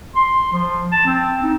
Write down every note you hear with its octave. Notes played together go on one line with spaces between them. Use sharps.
C6
F3
A5
C4
D#4